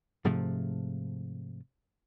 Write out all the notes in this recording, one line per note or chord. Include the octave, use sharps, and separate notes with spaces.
G#2 C3 F3 A3